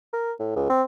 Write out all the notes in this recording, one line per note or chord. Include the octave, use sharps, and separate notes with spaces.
A#4
A2
C#2
C4